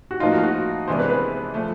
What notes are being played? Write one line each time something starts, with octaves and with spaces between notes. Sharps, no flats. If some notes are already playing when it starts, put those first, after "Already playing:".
F#4
A2 F3 A#3 D#4 F4
F#4
F#4
C3 E3 G#3 B3 D4 C5
B4
B4
F3 A3